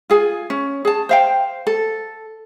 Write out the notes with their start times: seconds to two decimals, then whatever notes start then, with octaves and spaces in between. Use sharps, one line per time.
0.10 F4 G#4 G#5
0.50 C#4
0.85 G#4 A5
1.09 C5 F5 G5
1.67 A4